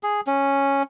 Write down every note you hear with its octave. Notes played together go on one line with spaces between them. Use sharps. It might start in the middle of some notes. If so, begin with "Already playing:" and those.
G#4
C#4